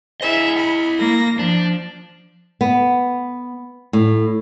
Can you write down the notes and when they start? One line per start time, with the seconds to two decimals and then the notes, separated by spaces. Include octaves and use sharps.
0.21 E4 G#4 D#5 E5
0.57 B5
0.98 A#3 A#6
1.39 F3 D4
2.61 B3
3.93 A2